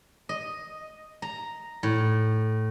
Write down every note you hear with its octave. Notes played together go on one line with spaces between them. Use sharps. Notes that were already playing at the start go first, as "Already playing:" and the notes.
D#5
A#5
A2